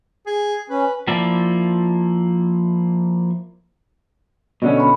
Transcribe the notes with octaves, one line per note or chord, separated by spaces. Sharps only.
G#4
C#4 B4
F3 A#3 E4 F4 D5
B2 D3 C#4 D5 D#5
B5 C#6